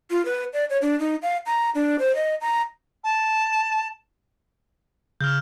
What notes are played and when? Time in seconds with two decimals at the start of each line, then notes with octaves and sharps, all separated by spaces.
0.11 F4
0.25 B4
0.53 D5
0.70 C#5
0.82 D4
1.00 D#4
1.22 F5
1.46 A#5
1.75 D4
1.99 C5
2.15 D#5
2.41 A#5
3.04 A5
5.21 C#3 F6 G6